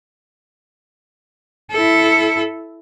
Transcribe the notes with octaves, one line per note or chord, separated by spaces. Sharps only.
E4 A4